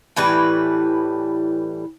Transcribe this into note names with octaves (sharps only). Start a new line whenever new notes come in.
A2 E3 G3 B4